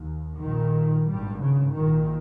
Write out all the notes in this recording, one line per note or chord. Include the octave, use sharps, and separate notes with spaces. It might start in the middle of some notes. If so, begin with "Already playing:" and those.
Already playing: D#2
A#1 A#2 D#3
G#1 G2 G3
C#3
A#1 A#2 D#3